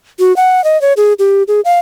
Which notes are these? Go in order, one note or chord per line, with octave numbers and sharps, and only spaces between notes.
F#4
F#5
D#5
C#5
G#4
G4
G#4
F5